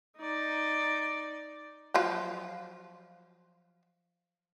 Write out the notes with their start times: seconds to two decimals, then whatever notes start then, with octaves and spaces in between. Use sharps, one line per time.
0.17 D#4 D5
1.94 F3 F#3 F4